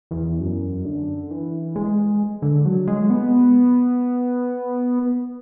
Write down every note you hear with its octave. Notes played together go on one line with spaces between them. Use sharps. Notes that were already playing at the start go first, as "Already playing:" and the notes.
E2
F#2
D3
E3
G#3
D3
F#3
G#3
B3